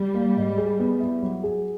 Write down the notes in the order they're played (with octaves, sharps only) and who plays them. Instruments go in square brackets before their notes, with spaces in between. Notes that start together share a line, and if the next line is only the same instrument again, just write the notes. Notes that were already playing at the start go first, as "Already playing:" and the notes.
Already playing: [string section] G3
[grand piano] A#3
G#2
G#4
B3
E4
F#3
G#4